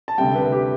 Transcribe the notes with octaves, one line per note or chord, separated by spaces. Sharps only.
A5
D2 C3 G3 G5
B4
G4